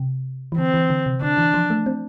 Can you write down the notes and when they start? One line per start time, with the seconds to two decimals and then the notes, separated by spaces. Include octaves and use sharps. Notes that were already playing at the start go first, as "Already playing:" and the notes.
Already playing: C3
0.52 E3
0.57 D3 C4
0.74 E3
0.90 D3
1.06 C3
1.22 D3 D4
1.38 E3
1.54 F3
1.70 A3
1.86 C4